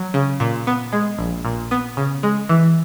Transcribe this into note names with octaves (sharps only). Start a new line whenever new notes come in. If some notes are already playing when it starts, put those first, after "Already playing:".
Already playing: F#3
C#3
A#2
B3
G#3
A#1
A#2
B3
C#3
G#3
E3